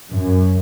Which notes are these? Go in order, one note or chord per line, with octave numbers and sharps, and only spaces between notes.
F#2